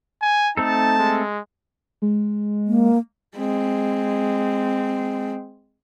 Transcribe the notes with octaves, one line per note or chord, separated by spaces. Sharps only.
G#5
A3 C4 D#4 A4 A5
G#3
G#3
A#3
G#3 C4